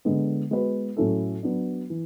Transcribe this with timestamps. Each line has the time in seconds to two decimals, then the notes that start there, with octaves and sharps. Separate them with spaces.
0.05 D3 G#3 B3
0.51 G#3 B3 F#4 B4
0.97 A2 F#3 C#4 E4 A4
1.43 F#3 B3 D4
1.90 E3